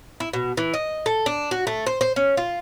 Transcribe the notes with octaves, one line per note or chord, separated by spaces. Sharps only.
E4
B2
E3
D#5
A4
D4
F#4
A3
C5
C5
C#4
F4